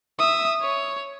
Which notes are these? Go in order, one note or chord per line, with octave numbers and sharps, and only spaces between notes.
E5 D#6
C#5